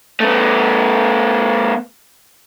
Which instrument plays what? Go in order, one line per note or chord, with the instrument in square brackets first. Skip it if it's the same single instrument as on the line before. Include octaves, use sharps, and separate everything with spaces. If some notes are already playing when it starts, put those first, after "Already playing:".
[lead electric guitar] A3 B3